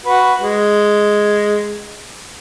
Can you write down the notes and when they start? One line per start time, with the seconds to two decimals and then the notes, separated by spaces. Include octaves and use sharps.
0.06 F#4 B4
0.41 G#3